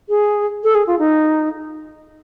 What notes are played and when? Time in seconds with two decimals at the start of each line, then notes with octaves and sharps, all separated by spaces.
0.09 G#4
0.64 A4
0.75 G#4
0.87 F4
0.99 D#4